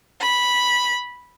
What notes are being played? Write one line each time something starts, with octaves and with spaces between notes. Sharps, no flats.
B5